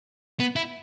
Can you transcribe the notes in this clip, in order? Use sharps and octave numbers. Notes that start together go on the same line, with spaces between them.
B3
E4